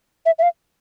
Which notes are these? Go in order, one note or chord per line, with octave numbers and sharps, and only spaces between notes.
E5
E5
F5